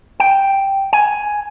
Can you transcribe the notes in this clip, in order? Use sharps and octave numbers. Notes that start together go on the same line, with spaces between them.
G5
G#5